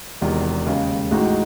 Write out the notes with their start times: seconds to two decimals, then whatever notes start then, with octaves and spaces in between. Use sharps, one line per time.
0.21 E1 E2 C3 D#3
0.66 D#2 C#3 G#3
1.11 A1 A2 G#3 D#4 F#4